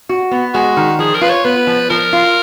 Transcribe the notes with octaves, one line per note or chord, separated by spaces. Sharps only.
F#4
B3
G#3 F#4
D#3
F3 G#4
A#4
F4 B4
C#5
B3 B4
F3
F3 A#4
F4